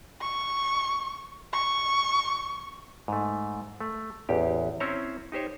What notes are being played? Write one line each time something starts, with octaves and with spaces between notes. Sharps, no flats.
C#6
C#6
G#2 A3
A3
A1 E2 G4
C4 C#4 E4 C5 C#5 A#5
D#4 G4 C5 C#5